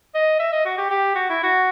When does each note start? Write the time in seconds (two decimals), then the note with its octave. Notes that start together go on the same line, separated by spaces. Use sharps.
0.14 D#5
0.39 E5
0.52 D#5
0.65 F#4
0.78 G4
0.90 G4
1.15 F#4
1.29 E4
1.43 F#4